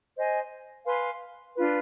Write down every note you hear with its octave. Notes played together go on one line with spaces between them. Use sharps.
C5 D#5 G#5
B4 F5 G#5 C6
D4 F4 B4